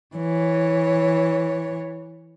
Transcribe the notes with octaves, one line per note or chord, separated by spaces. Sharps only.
E3 C#5